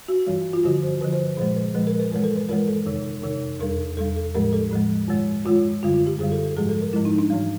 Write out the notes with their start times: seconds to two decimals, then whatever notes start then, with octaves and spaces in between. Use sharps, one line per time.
0.08 F#4
0.27 G2 E3 G3
0.53 F4
0.63 G2 D3 F3 F#4
0.83 C5
1.01 G2 D3 F3 B4
1.13 C5
1.37 A#2 F3 G#3 C5
1.56 B4
1.75 A#2 F3 G#3 B4
1.87 A#4
2.00 B4
2.12 G2 E3 G#3 A#4
2.24 A4
2.36 B4
2.49 G2 E3 G#3 A#4
2.68 A4
2.86 F2 C3 D#3
3.23 F2 C3 D#3
3.60 E2 B2 G3 A#4
3.97 E2 B2 G3 A4
4.16 A4
4.35 A2 F3 G#3 A#4
4.53 A4
4.71 A2 F3 G#3
5.08 G2 D#3 G#3
5.45 G2 D#3 G#3 F4
5.83 F#2 D3 G3 F4
5.94 F4
6.07 G4
6.19 F#2 D3 G3 G#4
6.32 A4
6.44 A4
6.57 G#2 F3 G#3 G#4
6.69 A4
6.81 A#4
6.93 G#2 F3 G#3 E4
7.05 D#4
7.18 D4
7.30 G#2 E3 G3